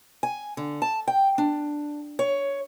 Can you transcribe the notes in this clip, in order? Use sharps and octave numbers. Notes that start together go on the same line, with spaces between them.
G#5
D3
A5
G5
D4
C#5